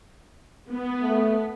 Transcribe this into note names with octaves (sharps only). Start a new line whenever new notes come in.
B3
A3